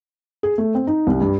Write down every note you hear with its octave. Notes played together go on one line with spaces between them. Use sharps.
G#4
A3
C4
D#4
C2
G2